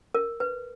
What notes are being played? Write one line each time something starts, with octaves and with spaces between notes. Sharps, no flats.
A#4
B4